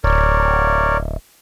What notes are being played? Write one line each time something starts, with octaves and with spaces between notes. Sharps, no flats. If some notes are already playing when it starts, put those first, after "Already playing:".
D1 A#4 C#5 D5